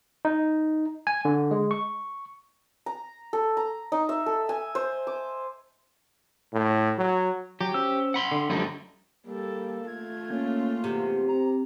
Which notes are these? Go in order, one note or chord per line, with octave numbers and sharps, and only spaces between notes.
D#4
G#5
D3
G#3
C#6
A#5
A4
A#5
D#4
E5
A4
G#5
C5
D6
A2
F#3
F#3 G4
C#4 C5 E6
F#5 B5 C6
D3
F#2 D3 F3 G3 A3 D#4
G3 A#3 A4
A3 F4 G#6
A#3 C#4
E2 C3
C4 A#5